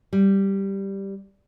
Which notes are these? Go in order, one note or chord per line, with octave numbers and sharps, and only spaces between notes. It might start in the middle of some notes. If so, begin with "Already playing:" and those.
G3